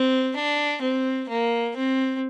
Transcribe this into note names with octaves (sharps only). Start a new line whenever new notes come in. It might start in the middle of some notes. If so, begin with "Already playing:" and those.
Already playing: C4
D4
C4
A#3
C4